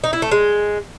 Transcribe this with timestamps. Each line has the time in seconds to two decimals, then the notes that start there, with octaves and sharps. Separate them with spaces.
0.04 D#4
0.13 E4
0.22 A3
0.31 G#3